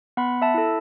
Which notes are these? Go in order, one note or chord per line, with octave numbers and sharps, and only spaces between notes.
B3 F#5 B5
E5 A5
E4 A4